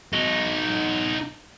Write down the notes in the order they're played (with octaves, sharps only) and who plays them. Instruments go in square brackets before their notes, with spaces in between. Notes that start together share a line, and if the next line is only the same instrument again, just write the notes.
[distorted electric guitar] D#4 F#4